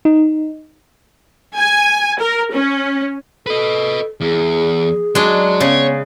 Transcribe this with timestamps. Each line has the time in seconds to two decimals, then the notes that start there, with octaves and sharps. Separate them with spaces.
0.05 D#4
1.57 G#5
2.20 A#4
2.54 C#4
3.46 A4 B4 D#5
4.21 E2 G#4
5.15 F#3 G#3 D4
5.60 C#3 B3 C#5